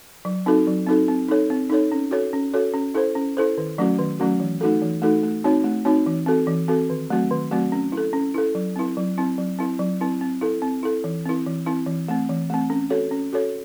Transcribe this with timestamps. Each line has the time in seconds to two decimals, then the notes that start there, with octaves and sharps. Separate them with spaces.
0.25 F#3
0.46 C4 D#4 F#4 A4
0.67 F#3
0.87 C4 D#4 F#4 A4
1.08 C4
1.29 D#4 A4 C#5
1.50 C4
1.70 D#4 A4 C#5
1.92 C#4
2.11 F#4 A4 C#5
2.33 C#4
2.54 F#4 A4 C#5
2.74 C#4
2.94 E4 A4 C5
3.15 C#4
3.37 E4 A4 C5
3.58 D#3
3.78 F#3 A3 C#4 F#4
3.99 D#3
4.19 F#3 A3 C#4 F#4
4.40 E3
4.61 A3 D#4 F#4 A4
4.82 E3
5.02 A3 D#4 F#4 A4
5.23 A3
5.44 C4 D#4 F#4 C#5
5.64 A3
5.85 C4 D#4 F#4 C#5
6.06 E3
6.26 C4 F#4 A4
6.47 E3
6.68 C4 F#4 A4
6.90 D#3
7.10 F#3 A3 C4 F#4
7.31 D#3
7.51 F#3 A3 C4 F#4
7.72 C#4
7.92 E4
7.97 A4
8.13 C#4
8.34 E4 A4
8.55 F#3
8.76 C4 E4
8.97 F#3
9.18 C4 E4
9.38 F#3
9.59 C4 E4
9.79 F#3
10.01 C4 E4
10.21 C4
10.41 E4 A4
10.62 C4
10.83 E4 A4
11.04 E3
11.25 C4 E4
11.46 E3
11.66 C4 E4
11.87 E3
12.09 A3 C4
12.29 E3
12.50 A3 C4
12.70 C#4
12.90 F#4 A4 C#5
13.11 C#4
13.33 F#4 A4 C#5